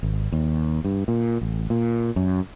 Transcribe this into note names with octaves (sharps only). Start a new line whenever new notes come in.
G#1
D#2
G2
A#2
A1
A#2
F#2